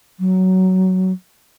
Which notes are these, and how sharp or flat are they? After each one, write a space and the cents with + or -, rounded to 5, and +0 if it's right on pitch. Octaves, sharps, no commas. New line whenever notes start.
F#3 +10